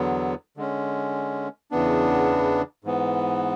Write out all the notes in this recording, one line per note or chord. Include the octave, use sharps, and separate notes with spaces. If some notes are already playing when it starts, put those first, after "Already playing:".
Already playing: E2 D3 F#3 B3
D3 G#3 C#4
E2 C#3 E3 B3 D4
G#2 E3 B3